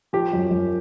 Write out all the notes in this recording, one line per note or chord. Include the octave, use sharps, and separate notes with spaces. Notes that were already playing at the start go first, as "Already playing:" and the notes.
F3 G4
F#2
F#2